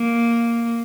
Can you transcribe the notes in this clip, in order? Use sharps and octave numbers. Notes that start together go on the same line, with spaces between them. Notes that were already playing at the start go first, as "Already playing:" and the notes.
Already playing: A#3